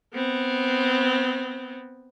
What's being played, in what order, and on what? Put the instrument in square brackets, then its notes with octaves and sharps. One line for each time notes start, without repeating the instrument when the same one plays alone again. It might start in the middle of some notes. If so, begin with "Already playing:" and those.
[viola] B3 C4